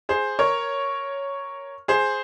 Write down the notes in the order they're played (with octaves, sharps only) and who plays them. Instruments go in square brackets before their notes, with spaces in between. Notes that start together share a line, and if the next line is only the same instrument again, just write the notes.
[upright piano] G#4 C5
A#4 C#5
G#4 C5